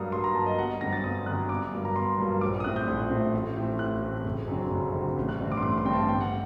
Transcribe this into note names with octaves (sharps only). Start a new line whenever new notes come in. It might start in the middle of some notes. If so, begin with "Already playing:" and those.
Already playing: G2 F#3 A#3 D#6
G2 C6
A#5
F#3 A#3 A5
D#5
G1 F#5
F#2 D3 G3 C4 A#6
A6
G1 D#6
F#2 D3 G3 C4 F#6
G1 D6
G2 F#3 A#3
A#5
G1 C6
G2 F#3 A#3
A#1 D6
D#6
A2 A3 C4 F#6
G6
A#1
A2 A3 C4
A1
A2 A3 C4
A1 F#6
A2 A3 C4
F#1
F#2 D3 F#3 C4
F#1
F#2 D3 F#3 C4
A1
F#6
G2 D3 A3 C4
D6
C6
A1 D6
C6
G2 D3 A3 C4 G5
A5
G1 G5
F#5